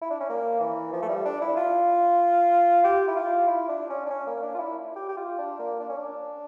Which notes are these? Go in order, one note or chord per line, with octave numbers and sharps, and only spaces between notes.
E4
D4
C#4
A#3
E3
F3
A3
G3
D4
E4
F4
G4
E4
F4
E4
D4
C#4
D4
C#4
A#3
D4
F4
E4
G4
G4
F4
D4
A#3
D4
C#4
D4